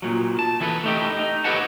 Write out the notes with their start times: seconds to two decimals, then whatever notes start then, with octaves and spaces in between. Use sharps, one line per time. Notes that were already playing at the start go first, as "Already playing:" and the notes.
0.02 A#2 F#3
0.39 A5
0.60 E3 E4 A4 B4
0.84 A3 D#4 G4
1.19 D#4
1.44 G4 A4 B4 C#5 F#5 A5